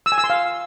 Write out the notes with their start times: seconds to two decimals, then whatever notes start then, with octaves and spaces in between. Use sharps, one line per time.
0.06 E6
0.12 G#5
0.18 E6
0.24 C6
0.30 F5